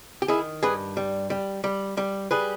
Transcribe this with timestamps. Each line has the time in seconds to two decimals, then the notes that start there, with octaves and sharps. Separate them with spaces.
0.22 G4
0.28 D#3 E4 G#4
0.63 G2 G#4 B4
0.97 G3
1.30 G3
1.64 G3
1.97 G3
2.31 G3 G#4 B4